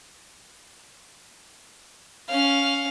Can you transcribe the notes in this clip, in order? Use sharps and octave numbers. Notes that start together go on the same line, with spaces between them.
C#4 F5